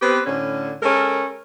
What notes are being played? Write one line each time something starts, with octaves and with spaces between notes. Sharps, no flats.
B3 C4 G4 B4
A2 D3 C#4
G#3 C#4 A4 A#4